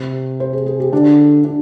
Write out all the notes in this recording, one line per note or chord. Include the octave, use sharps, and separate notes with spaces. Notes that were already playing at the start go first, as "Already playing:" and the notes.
Already playing: C3
C5
G#4
G#4
G4
D3 D4
D4